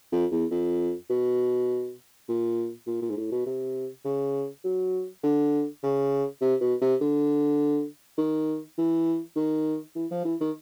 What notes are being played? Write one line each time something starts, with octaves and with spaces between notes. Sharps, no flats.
F2
E2
F2
B2
A#2
A#2
A#2
G#2
A2
B2
C3
C#3
F#3
D3
C#3
C3
B2
C3
D3
D#3
E3
D#3
E3
F3
E3
D#3